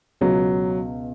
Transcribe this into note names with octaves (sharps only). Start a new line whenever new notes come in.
C#2 B2 F#3